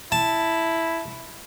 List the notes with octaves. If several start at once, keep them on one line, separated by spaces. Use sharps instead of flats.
E4 A5